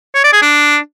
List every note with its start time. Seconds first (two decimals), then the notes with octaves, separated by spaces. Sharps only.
0.15 C#5
0.24 D5
0.33 G#4
0.42 D4